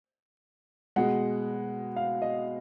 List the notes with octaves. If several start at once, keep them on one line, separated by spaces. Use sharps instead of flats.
B2 G#3 F#5
F5
D#5